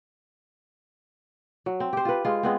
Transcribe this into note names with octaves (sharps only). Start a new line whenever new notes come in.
F#3
C4
G4 C5
F4 B4
G#3 F4
G#3 B3 C4